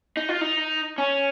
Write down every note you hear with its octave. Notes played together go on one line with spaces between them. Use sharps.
D#4
F4
D#4
C#4